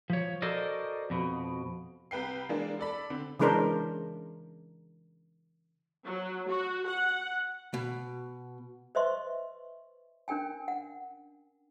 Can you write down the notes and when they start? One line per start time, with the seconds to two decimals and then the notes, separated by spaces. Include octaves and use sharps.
0.10 F3 C#5
0.42 F#4 A4 A#4 C5 D5 D#5
1.10 F2 B2
2.11 C2 B4 G5 C7
2.49 E3 G#3 A#3 D4
2.79 A4 D5 B5
3.10 D3 C4
3.39 C#3 E3 G#3 D4 A#4 C5
6.05 F#3
6.49 F#4
6.87 F#5
7.74 B2
8.95 B4 C5 D#5 E5 C6 C#6
10.28 C#4 D4 A#4 G5 G#5
10.68 F#5